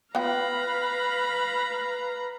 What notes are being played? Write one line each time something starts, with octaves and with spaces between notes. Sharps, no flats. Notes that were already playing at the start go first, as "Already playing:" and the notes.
B3 F4 B4 F5 G5 A#5 B5